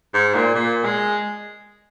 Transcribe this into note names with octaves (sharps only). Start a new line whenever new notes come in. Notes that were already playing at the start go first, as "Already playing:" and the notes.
G#2
A#2
A#2
G#3